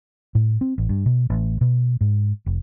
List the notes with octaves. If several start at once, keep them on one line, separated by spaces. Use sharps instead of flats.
A2
C4
A1
G2
B2
A1
B2
G#2
F1